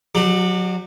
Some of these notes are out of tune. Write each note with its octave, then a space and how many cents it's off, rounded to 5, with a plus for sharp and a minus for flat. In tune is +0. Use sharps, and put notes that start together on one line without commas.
F#3 -15 D#4 -45 G4 +20